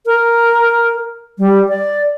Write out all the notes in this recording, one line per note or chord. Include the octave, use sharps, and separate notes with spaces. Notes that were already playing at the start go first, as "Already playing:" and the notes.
A#4
G3
D5